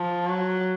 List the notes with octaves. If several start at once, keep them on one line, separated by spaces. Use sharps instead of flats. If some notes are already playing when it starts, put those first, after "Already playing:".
Already playing: F3
F#3